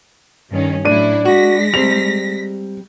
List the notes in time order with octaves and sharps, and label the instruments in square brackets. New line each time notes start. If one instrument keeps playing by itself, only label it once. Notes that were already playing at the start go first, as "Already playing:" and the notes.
[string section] G2 D#3 C#4
[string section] A2 F#3 E4 [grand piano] D4 D#7
[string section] G#3 A#6 B6 [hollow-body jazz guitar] F#4
[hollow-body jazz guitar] G3 C4 [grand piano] F7